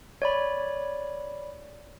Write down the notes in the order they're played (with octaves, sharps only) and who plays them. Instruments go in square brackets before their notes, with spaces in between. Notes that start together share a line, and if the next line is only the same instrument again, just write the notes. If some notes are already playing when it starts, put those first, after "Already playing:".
[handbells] C#5 D5 B5